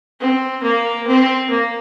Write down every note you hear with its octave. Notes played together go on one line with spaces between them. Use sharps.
C4
A#3
C4
A#3